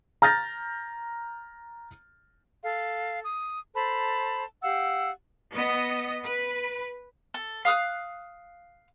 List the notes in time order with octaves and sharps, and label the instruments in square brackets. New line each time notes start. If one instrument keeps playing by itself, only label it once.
[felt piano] A#5 F6 G6 A6 A#6
[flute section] A4 F5
D#6
A4 C5 A5 B5
G4 F5 F#5 E6
[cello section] B3 D#5
B4
[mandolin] A4
F5 D#6 F6 F#6